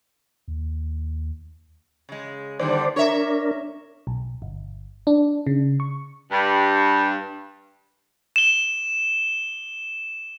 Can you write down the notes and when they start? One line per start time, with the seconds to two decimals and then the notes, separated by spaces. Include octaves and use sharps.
0.48 D#2
2.09 C#3 G#3
2.59 D#2 D3 G3 C5 D5
2.96 D4 A#4 C#5 E5
4.07 B1
4.42 G1
5.07 D4
5.47 C#3
5.80 C#6
6.31 G2
8.36 E7 G7